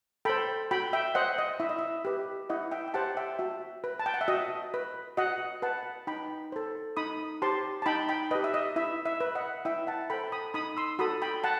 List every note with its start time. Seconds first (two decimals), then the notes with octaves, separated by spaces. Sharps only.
0.25 A4 C5 G5 B5
0.71 F#4 G5 B5
0.93 E5 G5
1.15 C5 D#5 F#5
1.38 D#5
1.60 E4 E5
1.69 D#5
1.79 E5
2.05 G4 B4
2.50 E4 D#5 F#5
2.72 E5 G5
2.88 G5
2.94 G4 C5 F#5 A5
3.17 E5 G5
3.39 F#4 E5
3.84 B4
3.99 A5
4.06 G5
4.14 F#5
4.21 E5
4.28 F#4 D#5
4.74 B4
5.17 F#4 D#5 F#5
5.62 B4 F#5 A5
6.07 D#4 G5 B5
6.52 A4 C5
6.97 D#4 B5 D#6
7.42 G4 C5 A5 C6
7.82 A5
7.86 D#4 G5 B5
8.09 G5 B5
8.31 G4 B4 D#5
8.44 E5
8.54 D#5
8.76 E4 E5
9.06 E5
9.20 B4
9.35 D#5 F#5
9.65 E4 E5 G5
9.87 F#5 A5
10.10 A4 C5 G5 B5
10.32 B5 D#6
10.54 D#4 B5 D#6
10.77 C6 E6
10.99 F#4 A4 B5 D#6
11.22 G5 B5
11.44 F#5 A5